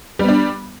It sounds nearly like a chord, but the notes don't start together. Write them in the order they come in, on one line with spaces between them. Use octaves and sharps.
G3 B3 D4